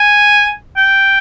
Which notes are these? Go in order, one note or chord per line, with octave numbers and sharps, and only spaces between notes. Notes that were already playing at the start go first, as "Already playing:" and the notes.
Already playing: G#5
G5